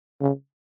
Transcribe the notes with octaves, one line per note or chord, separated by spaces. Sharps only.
C#3